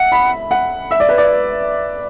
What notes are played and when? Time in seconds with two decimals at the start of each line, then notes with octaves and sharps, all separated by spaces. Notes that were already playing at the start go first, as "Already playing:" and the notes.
Already playing: E5 F#5
0.12 B5
0.51 F#5
0.91 E5
1.00 D5
1.09 B4
1.18 D5